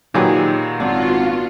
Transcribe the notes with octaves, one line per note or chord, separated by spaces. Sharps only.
A#2 D#3 F#3 G4 G#4 B4
G#1 B3 D4 F4 F#4